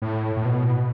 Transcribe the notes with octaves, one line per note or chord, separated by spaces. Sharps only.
A2
A2
B2